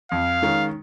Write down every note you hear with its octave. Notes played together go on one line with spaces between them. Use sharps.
F2 F5
D#3 G#3 C#4